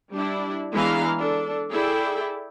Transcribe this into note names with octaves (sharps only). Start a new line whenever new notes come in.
G3 D4 E4
E3 G#3 B3 D4 F5 A#5
D4 A4
E4 G#4 A4 D5 E5 G5